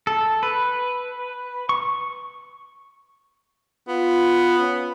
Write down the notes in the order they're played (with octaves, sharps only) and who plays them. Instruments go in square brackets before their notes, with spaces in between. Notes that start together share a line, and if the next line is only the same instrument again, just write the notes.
[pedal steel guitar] A4
B4
C#6
[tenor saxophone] B3 [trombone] F4
[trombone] C#4